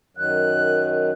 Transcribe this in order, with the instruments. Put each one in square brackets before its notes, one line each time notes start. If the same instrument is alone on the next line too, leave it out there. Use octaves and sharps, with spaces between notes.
[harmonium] F#2 D#3 F#3 [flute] F#6